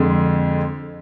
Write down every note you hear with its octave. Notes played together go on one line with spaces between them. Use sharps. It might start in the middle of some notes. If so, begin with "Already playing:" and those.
Already playing: F2 D3 G#3